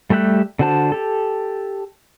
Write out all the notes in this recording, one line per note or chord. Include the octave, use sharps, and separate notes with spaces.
G3 A3 G4 E5 F#6
D3 D4 F#4 C5 A5
G4 A4